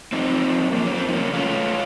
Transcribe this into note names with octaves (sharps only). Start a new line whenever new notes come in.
F#2 C4 D#4
F3
F3
F#2
F3 A#3
F3 C#4
C4
F2 D#4
C#3 A#3 C#4
A3 C#4 F4
A3